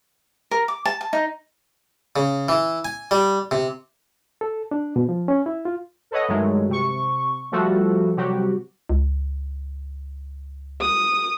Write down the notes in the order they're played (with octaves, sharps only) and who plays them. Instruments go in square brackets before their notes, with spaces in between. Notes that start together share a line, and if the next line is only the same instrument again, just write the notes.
[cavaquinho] A#4
D6
A5
A5
D#4
[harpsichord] C#3
E3
G#5
G3
C3
[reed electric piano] A4
D4
B2
F3
C#4
E4
F4
[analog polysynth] A4 B4 C#5 D#5 F#5
G2 D#3 F#3 G#3 A3
C3 C#6
F3 G3 A3 F#4 A4
C3 F#3 G3 F#4 G4
[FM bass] C#2
[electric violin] D#6